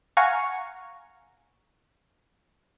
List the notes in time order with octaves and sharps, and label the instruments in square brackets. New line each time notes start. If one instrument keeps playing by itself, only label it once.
[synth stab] F5 F#5 G#5 A#5 C#6